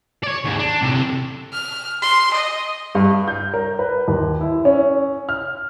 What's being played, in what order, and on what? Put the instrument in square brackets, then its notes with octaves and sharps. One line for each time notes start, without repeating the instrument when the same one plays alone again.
[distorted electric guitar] C#5 D5
D#2 G#2
D4
A2 C3
[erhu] F6
C6
D#5
[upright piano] G2
G6
A#4
B4
D#2
E4
C#4
F6